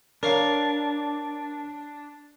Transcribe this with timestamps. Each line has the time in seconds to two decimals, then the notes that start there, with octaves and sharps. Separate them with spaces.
0.23 D4 A#4 C#5 F5